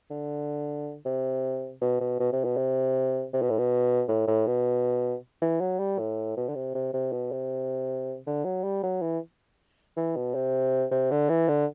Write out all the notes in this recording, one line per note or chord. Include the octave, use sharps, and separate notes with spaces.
D3
C3
B2
B2
B2
C3
B2
C3
C3
B2
A2
B2
A2
A2
B2
E3
F#3
G3
A2
B2
D3
C3
C3
C3
B2
C3
D3
F#3
G3
F#3
E3
E3
B2
C3
C3
D3
E3
D3